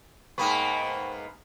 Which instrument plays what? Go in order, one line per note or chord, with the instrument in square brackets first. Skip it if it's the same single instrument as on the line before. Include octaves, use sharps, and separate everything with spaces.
[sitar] G#2 A#3 B3 [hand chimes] G5 B5 C#6